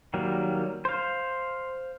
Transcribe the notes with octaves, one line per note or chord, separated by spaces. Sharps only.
D#3 F#3 G3 A#3
C5 F5